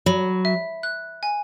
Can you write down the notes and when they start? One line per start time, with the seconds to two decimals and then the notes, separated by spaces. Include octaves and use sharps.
0.06 F#3 B5
0.45 E5
0.83 F#6
1.23 G#5